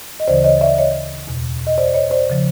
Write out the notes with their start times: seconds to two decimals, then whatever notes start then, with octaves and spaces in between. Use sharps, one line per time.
0.20 D#5
0.28 D2 C#3 E3 C5 D5
0.44 C#5 D#5
0.61 D5 E5
0.78 C#5 D#5
1.28 E2 B2
1.67 D#5
1.78 C5 D5
1.94 C#5 D#5
2.10 C5 D5
2.30 C#3 F3